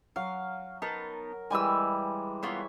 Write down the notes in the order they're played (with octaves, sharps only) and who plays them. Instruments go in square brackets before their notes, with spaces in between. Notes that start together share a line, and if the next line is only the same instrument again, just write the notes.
[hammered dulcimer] F#3 [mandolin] F5
[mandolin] B3 D#4 A5 [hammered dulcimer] A#4
[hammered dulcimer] E3 G3 G#3 [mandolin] G#5 E6
[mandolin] A#3 B3 F4 [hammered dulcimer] C#5 E5